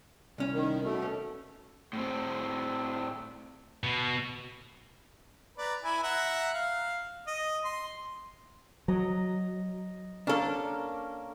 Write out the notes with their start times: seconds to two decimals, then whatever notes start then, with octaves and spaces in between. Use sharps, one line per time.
0.38 C2 C#4
0.54 D#3
0.84 B2 A3
1.02 C#4
1.93 A2 C4
3.83 B2
5.58 B4 D5 A#5
5.84 E4 G#5 B5
6.03 E5 F#5 A#5
6.54 F5
7.27 D#5
7.64 C6
8.88 F#3 D#5 A#5
10.27 A#3 C#4 D4 A4 A#4